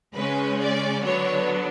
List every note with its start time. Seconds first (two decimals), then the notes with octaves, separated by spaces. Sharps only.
0.15 C#3 G#3 C#4 B4
0.61 D5
1.04 D3 F#3 B3 D4 C#5